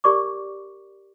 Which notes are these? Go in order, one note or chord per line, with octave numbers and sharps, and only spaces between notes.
G4 A#4 D5 C#6 D6